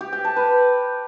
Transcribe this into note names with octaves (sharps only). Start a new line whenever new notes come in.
G4
G5
A5
B4